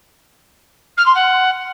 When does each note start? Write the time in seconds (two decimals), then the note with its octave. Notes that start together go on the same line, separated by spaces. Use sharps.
0.97 F6
1.06 C6
1.14 F#5